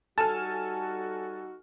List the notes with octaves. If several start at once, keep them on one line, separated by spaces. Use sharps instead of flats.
G3 D#4 F#4 A4 G#5 A5 F6